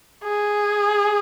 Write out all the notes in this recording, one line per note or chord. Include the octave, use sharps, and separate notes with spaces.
G#4